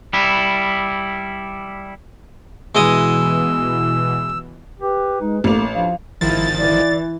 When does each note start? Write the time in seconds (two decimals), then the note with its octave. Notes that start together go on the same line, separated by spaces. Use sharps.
0.13 G3 E4
2.75 B2 E3 G#3 D#5 E6
4.81 G4 B4
5.21 G#3 D#4
5.44 A1 A3 A#3 F7
5.74 F3 D4 F5
6.21 G#1 D#3 F3 E4 A6
6.58 E3 D5